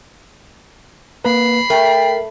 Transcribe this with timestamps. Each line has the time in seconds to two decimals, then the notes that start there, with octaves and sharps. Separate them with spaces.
1.25 A#3 B4 B5 C7
1.70 A3 A#4 G5